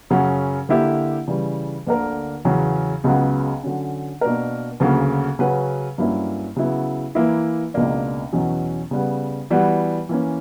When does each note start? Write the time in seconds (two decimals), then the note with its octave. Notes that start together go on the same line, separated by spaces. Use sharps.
0.10 F#2 C#3 F#3 C#4 F#4
0.69 D3 A#3 E4 G4
1.28 C#3 E3 G3
1.87 D2 D3 A#3 D4 A#4
2.45 E2 C#3 F#3 C#4
3.04 C#2 C#3 F#3 B3
3.63 D3 F#3 C#4
4.21 B2 A#3 D4 A#4
4.80 D2 C#3 F#3 A#3
5.39 C#3 F#3 C#4 F#4 B4
5.98 G2 F#3 A#3 C#4 E4
6.56 C#3 F#3 B3 E4
7.15 E3 A#3 E4
7.74 C#2 B2 A#3 D4
8.32 E2 B2 F#3 C#4
8.91 C#3 G3 B3
9.50 E3 G3 B3 F#4 B4
10.09 E3 A#3 C#4